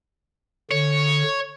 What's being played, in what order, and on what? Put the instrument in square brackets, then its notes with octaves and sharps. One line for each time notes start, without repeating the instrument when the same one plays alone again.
[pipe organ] D3 [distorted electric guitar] C#5